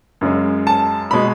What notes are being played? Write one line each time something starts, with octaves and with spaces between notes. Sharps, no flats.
F#2 C#3 G#3
A5
B2 G#3 B5